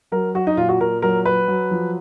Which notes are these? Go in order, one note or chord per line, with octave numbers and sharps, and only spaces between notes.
F#3 A#4
F#3 F#4
D#4
A#2 F4
F#4
A#2 A#4
F#3 A#4
F#3 B4
F#3
F3